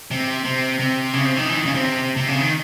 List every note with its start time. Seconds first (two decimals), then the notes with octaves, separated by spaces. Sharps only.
0.11 C3
0.45 C3
0.80 C3
1.13 C#3
1.25 C3
1.37 D#3
1.49 E3
1.57 D#3
1.65 C#3
1.74 C3
2.17 C3
2.29 C#3
2.40 D#3